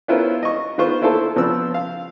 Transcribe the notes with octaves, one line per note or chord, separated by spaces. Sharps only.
B3 C#4 E4 F4 A#4 C5
D#5 C#6
D#3 B3 F4 C5 C#6
A#3 E4 F4 A4 C5 A5
C#3 F3 B3 C4 D4 E6
F5